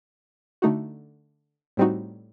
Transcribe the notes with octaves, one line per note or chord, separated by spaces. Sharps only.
D3 A3 D#4 F#4
A2 G3 C4 D#4 F#4